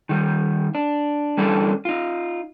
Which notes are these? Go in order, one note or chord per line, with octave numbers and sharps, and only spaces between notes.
D#3 G3
D4
E3 G3 C#4 D4 G4 A4
D#4 F4